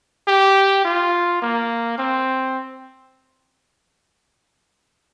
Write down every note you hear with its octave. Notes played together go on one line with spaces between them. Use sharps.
G4
F4
A#3
C4